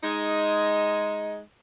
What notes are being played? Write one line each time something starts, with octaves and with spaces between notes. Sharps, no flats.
G#3 D#4